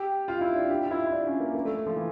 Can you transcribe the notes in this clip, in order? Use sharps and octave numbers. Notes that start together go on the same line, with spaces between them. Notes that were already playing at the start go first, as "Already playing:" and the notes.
Already playing: G4
F4
E4
D4
G4
F4
E4
E4
D4
C#4
A#3
A#3
A3
F3
E3